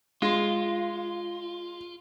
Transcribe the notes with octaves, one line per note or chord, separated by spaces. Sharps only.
G#3 F4